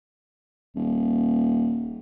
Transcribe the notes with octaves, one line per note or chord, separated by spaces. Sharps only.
D#1